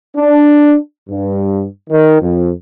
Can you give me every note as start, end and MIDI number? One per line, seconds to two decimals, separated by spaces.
0.17 0.76 62
1.10 1.64 43
1.90 2.19 51
2.21 2.50 41